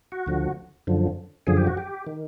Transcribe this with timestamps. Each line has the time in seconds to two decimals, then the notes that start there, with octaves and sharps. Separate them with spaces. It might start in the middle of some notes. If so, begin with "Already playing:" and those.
0.12 F#4
0.26 D2 D3 F3
0.87 F#2 D3 F3
1.47 F#2 D3 F3 G#4
1.57 G4
1.67 F#4
1.77 G4
2.07 D#3